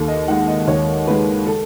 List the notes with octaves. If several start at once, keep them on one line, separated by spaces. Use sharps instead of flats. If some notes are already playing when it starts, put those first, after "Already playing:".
Already playing: D#2 A4
D#5
D#3 G#3 F#5
D#5
D#2 C#5
D#3 G#3 B4
A4